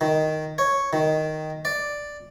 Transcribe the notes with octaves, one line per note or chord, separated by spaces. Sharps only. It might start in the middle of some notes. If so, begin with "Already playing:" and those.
D#3
C#5
D#3
D5